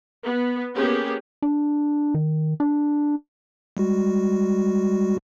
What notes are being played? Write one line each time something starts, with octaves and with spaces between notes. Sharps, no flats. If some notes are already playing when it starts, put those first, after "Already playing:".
B3
A#3 B3 C#4 G4 G#4
D4
D#3
D4
G3 G#3 F#4